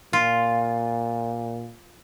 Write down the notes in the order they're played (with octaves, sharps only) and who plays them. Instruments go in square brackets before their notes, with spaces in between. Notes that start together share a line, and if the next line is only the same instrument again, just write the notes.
[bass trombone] A#2 [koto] F4